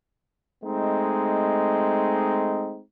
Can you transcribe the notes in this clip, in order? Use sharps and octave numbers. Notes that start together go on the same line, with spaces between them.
G#3 A3 C4 D#4